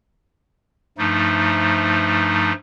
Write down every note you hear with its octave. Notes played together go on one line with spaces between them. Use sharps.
G2 F3 A3 D#4